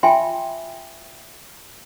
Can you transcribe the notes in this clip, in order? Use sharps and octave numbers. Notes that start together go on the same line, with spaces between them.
F4 E5 G5 G#5 B5 C6